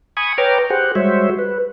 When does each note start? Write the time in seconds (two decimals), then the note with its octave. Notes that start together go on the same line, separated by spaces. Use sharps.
0.17 G#5 B5 C#6 D#6
0.38 B4 C#5 G5 A#5 D6 F6
0.70 G4 G#4 C5 F#5
0.95 G3 G#3 F#4 C5 C#5 E5
1.39 B4